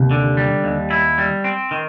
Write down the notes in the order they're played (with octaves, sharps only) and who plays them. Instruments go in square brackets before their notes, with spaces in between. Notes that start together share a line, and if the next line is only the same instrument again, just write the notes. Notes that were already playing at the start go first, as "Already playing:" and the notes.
Already playing: [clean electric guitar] D#2 [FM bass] C3
[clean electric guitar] D3
G3
D#2
E4
G3
C4
D#3